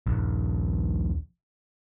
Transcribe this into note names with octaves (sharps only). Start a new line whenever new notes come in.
D#1 A#1